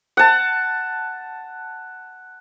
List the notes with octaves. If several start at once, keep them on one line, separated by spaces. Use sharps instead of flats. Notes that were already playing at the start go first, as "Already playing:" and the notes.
F#5 A5